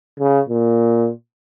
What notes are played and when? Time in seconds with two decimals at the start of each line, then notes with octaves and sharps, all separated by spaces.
0.20 C#3
0.49 A#2